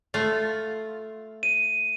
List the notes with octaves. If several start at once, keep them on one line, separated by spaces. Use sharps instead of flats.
A3 F4
D#7